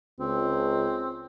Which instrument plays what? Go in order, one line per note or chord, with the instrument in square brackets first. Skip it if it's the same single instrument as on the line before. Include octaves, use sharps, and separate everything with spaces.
[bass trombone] C#2 [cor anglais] C4